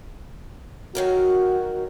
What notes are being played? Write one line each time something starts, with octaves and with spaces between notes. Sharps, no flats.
D#3 F#3 F#4 A#4